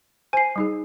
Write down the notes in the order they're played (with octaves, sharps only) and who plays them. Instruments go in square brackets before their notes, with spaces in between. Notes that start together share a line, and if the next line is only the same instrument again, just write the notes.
[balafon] C5 [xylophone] G#5 C7
[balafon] G3 D#4 G#4